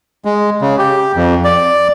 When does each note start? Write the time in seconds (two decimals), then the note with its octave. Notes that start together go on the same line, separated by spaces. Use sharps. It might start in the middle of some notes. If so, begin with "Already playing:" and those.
0.25 G#3
0.61 C#3
0.79 G4
1.16 F2
1.44 D5